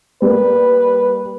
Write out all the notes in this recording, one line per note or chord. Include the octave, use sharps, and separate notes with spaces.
G3 A#3 B4